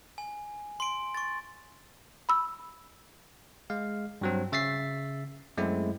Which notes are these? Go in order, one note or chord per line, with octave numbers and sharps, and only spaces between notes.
G#5
C6 D7
C#6 A6
B5 E6
G#3 F5
G2 F#3 C4
C#3 E5 A6 B6 C7
F#2 G#3 A3 C4 E4